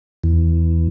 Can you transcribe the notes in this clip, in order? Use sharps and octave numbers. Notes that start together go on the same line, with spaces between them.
E2